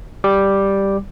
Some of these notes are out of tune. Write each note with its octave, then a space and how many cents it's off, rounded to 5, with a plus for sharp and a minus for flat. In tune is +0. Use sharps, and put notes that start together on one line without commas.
G3 +0 D6 +0